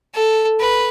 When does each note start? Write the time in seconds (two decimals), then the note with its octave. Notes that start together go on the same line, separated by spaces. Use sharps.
0.14 A4
0.60 B4